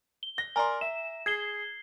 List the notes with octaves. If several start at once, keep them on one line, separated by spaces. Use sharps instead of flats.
G7
A#6
A#4 D5 G#5 A#5 C6
E5 E7
G#4 G#6 C7 G7